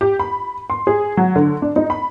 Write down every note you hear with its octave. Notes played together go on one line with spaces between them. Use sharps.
G4
B5
C6
G#4
F#3
D3
D4
D#4
B5